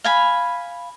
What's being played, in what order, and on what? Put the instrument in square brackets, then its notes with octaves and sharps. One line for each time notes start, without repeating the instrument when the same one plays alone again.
[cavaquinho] F5 G#5 B5